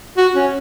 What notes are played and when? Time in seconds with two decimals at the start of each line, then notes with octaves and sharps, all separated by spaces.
0.17 F#4
0.35 C#4